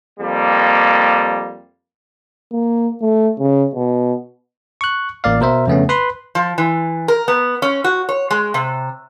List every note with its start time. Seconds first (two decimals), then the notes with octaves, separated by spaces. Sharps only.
0.20 F2 G3 A#3
2.52 A#3
3.01 A3
3.40 C#3
3.75 B2
4.81 C#6 F#6
5.24 A1 A#3 D5 F5
5.41 B2 A#4 C5 E5
5.67 F2 C#3 A3 B3 C#4
5.89 B4 B5 C6
6.35 F3
6.58 E3
7.08 A#4
7.28 B3
7.62 C#4
7.84 F#4
8.09 C#5
8.31 G#3
8.54 C3